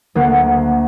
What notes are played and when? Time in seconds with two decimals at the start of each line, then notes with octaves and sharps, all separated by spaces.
0.15 D2 A#3 F#5